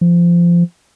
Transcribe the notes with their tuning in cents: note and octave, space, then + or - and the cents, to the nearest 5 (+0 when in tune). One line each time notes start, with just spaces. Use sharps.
F3 -20